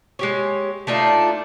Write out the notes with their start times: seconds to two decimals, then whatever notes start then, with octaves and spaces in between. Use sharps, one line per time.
0.19 G#3 G4 C#5
0.87 A3 D4 D#4 F4